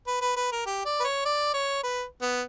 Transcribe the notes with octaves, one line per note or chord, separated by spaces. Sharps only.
B4
B4
B4
A#4
G4
D5
B4
C#5
D5
C#5
B4
B3